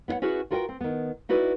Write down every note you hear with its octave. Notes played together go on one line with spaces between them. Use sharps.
B3 E4 C#5 F#5
C#4 E4 F#4 G#4 B4
F4 F#4 A#4 B4 F#5 G5
C4
D#3 B3
D#4 E4 F#4 B4 D5